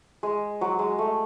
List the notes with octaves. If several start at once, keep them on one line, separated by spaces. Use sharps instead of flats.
G#3
F#3
G#3
A3